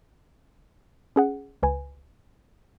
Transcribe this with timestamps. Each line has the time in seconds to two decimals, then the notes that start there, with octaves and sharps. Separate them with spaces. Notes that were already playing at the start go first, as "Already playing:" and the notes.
1.16 C#4 G#4 F#5
1.63 C#2 B4 G#5